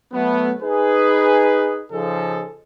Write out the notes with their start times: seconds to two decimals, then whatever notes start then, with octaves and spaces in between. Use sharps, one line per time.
0.12 F#3 A3 B3
0.62 D#4 G#4 B4
1.92 C#3 F3 D#4 G#4 A4